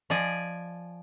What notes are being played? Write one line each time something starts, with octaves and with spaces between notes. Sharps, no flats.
F3 D5 D#5 G#5